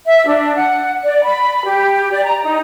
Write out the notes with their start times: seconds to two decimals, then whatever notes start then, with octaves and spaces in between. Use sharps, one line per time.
0.06 E5
0.25 D4
0.56 F#5
1.03 D5
1.23 B5
1.65 G4
2.11 D5
2.24 A#5
2.44 D#4